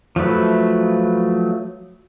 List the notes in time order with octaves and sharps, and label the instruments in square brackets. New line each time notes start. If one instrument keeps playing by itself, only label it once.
[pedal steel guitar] F3 F#3 A3 B4